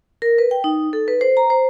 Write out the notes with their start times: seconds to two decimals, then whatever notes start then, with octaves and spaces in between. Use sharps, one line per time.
0.22 A#4
0.38 B4
0.51 G5
0.64 D#4
0.93 A4
1.08 B4
1.21 C5
1.37 A#5
1.50 C5